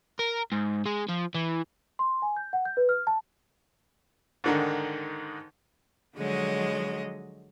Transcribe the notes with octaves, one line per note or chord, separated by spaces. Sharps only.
A#4
G#2
G#3
F3
E3
C6
G#5
G6
F#5
G6
B4
F6
A5
G#2 D3 D#3
D3 F3 F#3 G#3 C#5 D#5